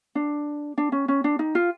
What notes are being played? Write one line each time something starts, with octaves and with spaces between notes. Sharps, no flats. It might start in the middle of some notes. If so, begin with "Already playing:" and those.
D4
D4
C#4
C#4
D4
D#4
F4